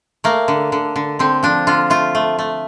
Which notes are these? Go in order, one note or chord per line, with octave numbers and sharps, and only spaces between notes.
A3 A#3
D3
D3
D3
D3 C4
F3 D4
D3 F4
A3 F4
A3
A3